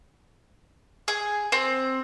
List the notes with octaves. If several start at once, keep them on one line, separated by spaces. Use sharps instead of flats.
G#4
C4